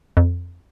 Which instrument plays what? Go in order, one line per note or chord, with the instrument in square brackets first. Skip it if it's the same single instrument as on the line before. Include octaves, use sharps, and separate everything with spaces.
[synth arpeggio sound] F2